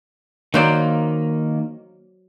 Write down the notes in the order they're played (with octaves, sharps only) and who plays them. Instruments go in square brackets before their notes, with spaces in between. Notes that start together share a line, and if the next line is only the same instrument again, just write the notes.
[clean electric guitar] D#3 A#3 [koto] F#3 C5 D5